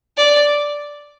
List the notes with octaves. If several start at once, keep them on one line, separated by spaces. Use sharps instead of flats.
D5